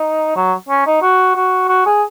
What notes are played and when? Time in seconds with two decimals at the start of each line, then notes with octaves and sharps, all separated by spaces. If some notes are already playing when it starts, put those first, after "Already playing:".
Already playing: D#4
0.36 F#3
0.69 C#4
0.87 D#4
1.02 F#4
1.35 F#4
1.69 F#4
1.86 G#4